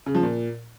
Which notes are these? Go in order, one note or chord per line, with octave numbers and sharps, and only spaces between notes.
C#3
F3
A#2